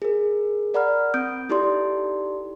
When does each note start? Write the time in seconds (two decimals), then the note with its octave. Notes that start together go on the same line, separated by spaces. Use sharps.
0.02 G#4 A#4
0.74 A#4 D5 F#5 A#5 B5 F6
1.14 C4 D#6 G6 D7
1.49 D#4 E4 G4 A4 D5 C6